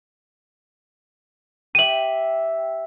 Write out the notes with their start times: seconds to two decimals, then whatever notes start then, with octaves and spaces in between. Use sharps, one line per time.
1.75 G4 E5 D#7 F#7